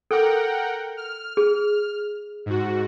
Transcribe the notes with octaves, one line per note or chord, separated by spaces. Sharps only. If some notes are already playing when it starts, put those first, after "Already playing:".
A4 A#4 F#5 G5 D6
F6
G#4
G#2 F#4